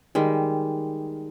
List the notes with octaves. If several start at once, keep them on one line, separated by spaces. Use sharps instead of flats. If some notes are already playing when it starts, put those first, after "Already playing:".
D#3 G3 G#3